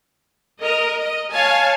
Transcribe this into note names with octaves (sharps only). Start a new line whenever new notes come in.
A#4 D#5
D#5
C#5 F5 G#5 A5